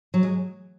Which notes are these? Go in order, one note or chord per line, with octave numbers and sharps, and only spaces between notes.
F#3
G#3